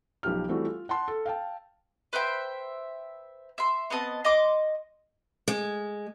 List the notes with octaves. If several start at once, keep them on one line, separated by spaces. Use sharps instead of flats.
B1 F3 G4 F6
E3 G3 A3 C4 F#4
F4
F#5 A5 C6
A4
F5 G5 A5
B4 C5 E5 G5
E5 C6
B3 C4 D#5 A5
D#5 C6 D6
G#3